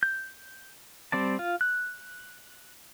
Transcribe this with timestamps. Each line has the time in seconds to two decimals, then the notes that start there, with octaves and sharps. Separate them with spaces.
0.03 G6
1.12 G3 C4 D5 A5
1.39 F4
1.61 F#6